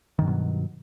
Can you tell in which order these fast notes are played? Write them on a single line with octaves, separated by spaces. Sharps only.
D#3 G2 F#3 B2